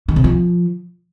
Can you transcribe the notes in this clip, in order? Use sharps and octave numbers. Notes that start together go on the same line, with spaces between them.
D#3
C3
F3